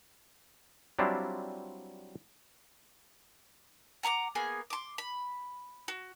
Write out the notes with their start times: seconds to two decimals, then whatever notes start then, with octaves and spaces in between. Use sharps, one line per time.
0.99 F#3 G3 C4 D4 E4 F4
4.03 F#5 A#5 C#6 D6
4.35 A#3 B3 G#4 G#5
4.70 C6 D6
4.98 B5
5.88 F#4